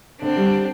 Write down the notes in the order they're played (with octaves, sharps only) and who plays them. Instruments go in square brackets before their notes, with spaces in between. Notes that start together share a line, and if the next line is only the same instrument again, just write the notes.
[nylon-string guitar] D3 [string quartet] C4 D4
[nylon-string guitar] G3